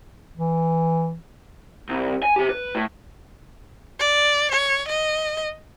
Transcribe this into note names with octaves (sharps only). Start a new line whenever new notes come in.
E3
C2
G#5
C3 G4
B4
A2
D5
C#5
D#5